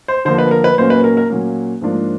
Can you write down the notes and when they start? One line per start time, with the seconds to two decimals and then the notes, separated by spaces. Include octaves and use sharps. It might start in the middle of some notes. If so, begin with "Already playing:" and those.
0.08 C5
0.25 D3 F3 A#3 C5
0.38 B4
0.51 A#4
0.64 B4
0.78 A#2 F#3 A#3 C#4 C5
0.90 B4
1.04 A#4
1.17 A#4
1.29 A#2 F#3 A#3 C#4
1.81 G#2 F3 A#3 D4 F4